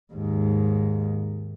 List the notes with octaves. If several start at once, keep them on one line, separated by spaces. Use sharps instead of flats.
D#2 G#2